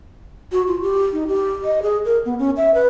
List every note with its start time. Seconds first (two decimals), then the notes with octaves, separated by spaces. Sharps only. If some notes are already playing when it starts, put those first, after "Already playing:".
0.52 F#4
0.67 F4
0.82 G4
1.12 D#4
1.27 G4
1.64 D#5
1.83 G#4
2.06 A#4
2.26 B3
2.39 C#4
2.57 E5
2.74 B4